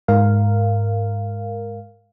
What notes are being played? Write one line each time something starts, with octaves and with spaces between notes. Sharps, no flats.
G#2 A#4 F5